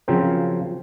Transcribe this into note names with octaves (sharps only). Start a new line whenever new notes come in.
C#3 F3 F#3 C4 A#4 C5